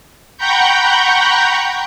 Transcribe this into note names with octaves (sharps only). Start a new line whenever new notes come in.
F#5 G5 A#5 B5 C#6 G6